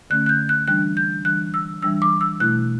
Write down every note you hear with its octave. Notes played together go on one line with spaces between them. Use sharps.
D3 A3 C#4 F#6
F#6
G6
F#6
E3 G3 D4 F#6
G6
E3 G3 D4 F#6
E6
E3 G3 D4 E6
D6
E6
B2 A3 E4 F#6